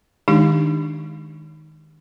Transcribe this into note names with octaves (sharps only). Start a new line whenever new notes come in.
D#3 G#3 D4 D#4 G4